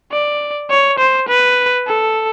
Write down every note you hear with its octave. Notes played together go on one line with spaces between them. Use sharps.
D5
C#5
C5
B4
A4